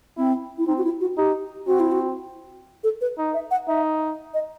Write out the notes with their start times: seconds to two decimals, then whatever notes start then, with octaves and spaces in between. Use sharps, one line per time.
0.17 C4 E4
0.58 E4
0.67 C4 D#4
0.78 F#4
0.84 E4
1.01 F#4
1.17 D#4 G4
1.67 C4 F#4
1.80 E4
1.92 F#4
2.84 A4
3.01 B4
3.18 D#4
3.34 E5
3.51 F#5
3.67 D#4 E5
4.34 D#5